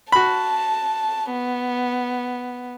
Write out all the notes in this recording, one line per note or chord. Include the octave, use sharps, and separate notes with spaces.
F#4 A5 B5
B3